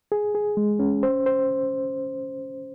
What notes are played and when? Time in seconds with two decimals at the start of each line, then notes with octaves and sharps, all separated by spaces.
0.12 G#4
0.35 G#4
0.57 G#3
0.79 C#4
1.03 C5
1.26 C5